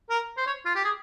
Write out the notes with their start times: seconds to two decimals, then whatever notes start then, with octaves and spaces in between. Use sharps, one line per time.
0.10 A#4
0.37 C5
0.47 C#5
0.66 F4
0.75 G4
0.85 G#4